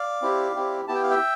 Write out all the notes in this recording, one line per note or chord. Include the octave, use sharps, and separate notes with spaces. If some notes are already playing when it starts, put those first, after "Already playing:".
Already playing: D5 F5
C4 E4 G4
C4 E4 G4
B3 E4 G4 A5
G5
F5
E5 G5